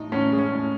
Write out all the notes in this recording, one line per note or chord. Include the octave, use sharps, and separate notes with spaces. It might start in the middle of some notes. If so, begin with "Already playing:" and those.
Already playing: A2 D#4
A2 C#4
G#3
C#4
A2